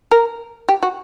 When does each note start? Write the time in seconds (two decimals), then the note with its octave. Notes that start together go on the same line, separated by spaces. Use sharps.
0.11 A#4
0.69 G4
0.83 F#4